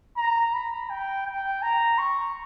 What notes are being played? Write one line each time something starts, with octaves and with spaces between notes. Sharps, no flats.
A#5
B5
G5
G5
A#5
C#6